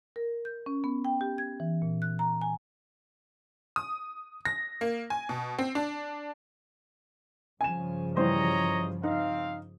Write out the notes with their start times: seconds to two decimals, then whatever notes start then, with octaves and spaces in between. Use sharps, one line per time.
0.16 A#4
0.45 G6
0.66 C#4
0.84 B3
1.05 G5
1.21 G4
1.38 G#6
1.60 E3
1.82 A#2
2.02 F#6
2.19 A#5
2.42 G#5
3.76 D#6
4.45 A#6
4.81 A#3
5.10 G#5
5.29 B2
5.59 C4
5.75 D4
7.61 G2 C#3 F3 G#5 E7
8.17 E3 G3 C5 C#5 D#5 A#5
9.03 C4 D#4 F5